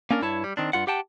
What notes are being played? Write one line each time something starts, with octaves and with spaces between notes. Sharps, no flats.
A#3 C#4 D4 A#4
G2 E4 C#5 A5
G3
D#3 C4 D4
G2 F4 F#5
G4 F#5 G5 A5